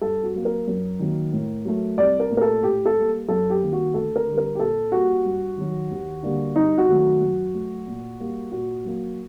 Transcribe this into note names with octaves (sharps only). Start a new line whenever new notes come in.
G2 A4
F#4
F#3 A#3
A#4
F#2
D#3 F#3 A#3
A2
F#3 A3
C2 D5
A#4
A#2 A3
A#4
A4
A2 G4
A4
G3 A#3
F#2 A4
G4
D#3 G3 A#3
F#4
D2 A4
A#4
D3 G3
A#4
G4
A#2 A4
G3 A#3 F#4
G2
D#3 F#3
D#2
D3 G3 A#3
G2 D#4
F#4
D#3 F#3 A3
F#4
F#2
F#3 A3
A#2
G3 A#3
A#2 F#4
F#3 A#3